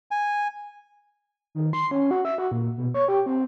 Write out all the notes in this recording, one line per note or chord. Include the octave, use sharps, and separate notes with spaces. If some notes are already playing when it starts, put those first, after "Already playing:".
G#5
D#3
C6
C#4
F#4
E5
F#4
A#2
B2
C#5
G4
C4